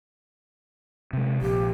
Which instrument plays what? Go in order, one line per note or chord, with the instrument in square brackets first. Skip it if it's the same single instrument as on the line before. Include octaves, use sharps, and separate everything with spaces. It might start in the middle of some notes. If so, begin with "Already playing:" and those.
[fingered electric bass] C3 G#3
[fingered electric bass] A#1 [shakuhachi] G4